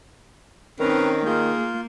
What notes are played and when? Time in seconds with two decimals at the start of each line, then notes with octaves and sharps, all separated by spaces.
0.80 D#3 C4 C#4 D#4 A#4 B4 A#5
1.26 A#3 F4 G#4 G6